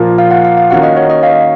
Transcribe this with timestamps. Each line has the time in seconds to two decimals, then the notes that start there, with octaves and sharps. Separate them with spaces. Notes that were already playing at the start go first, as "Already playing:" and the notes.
Already playing: A#2 F3 A#3 F4
0.18 F5
0.31 F#5
0.44 F5
0.57 F5
0.70 D#3 A#3 C#4 F#4 F#5
0.83 D#5
0.97 C#5
1.10 D#5
1.23 F5